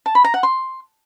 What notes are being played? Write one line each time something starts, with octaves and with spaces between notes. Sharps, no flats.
A5
B5
A#5
F#5
C6